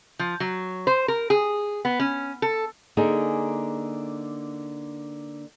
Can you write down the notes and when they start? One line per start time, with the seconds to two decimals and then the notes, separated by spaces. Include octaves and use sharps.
0.19 F3
0.40 F#3
0.87 C5
1.08 A#4
1.30 G#4
1.85 B3
2.00 C#4
2.42 A4
2.97 D3 A#3 D#4 G#4 G#5